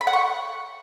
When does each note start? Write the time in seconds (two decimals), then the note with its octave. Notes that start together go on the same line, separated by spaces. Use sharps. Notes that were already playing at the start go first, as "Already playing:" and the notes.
0.01 B5
0.07 F#5
0.13 C#6